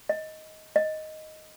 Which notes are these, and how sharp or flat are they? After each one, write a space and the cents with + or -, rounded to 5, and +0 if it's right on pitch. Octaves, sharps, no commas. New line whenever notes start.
D#5 +10
D#5 +0